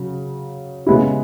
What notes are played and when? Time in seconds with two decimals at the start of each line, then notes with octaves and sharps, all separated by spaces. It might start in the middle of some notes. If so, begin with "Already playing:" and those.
Already playing: C#3 F#3
0.87 C#3 G#3 B3 E4